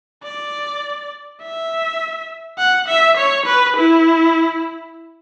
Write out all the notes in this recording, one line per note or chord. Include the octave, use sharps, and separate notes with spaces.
D5
E5
F#5
E5
C#5
B4
E4